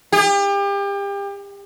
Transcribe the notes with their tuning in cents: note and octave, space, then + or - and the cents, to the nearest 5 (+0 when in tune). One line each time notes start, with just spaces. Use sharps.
G4 +35